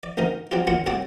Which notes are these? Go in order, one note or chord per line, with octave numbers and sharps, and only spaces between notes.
D5
A1 D2 D#4 A#4
F#3 G3 C4 D4 F4
D#2 D4 F4 F#4 C#6
C2 A2 F#4 A5 D6